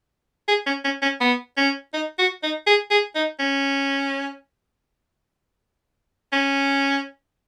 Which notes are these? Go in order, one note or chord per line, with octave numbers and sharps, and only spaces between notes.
G#4
C#4
C#4
C#4
B3
C#4
D#4
F#4
D#4
G#4
G#4
D#4
C#4
C#4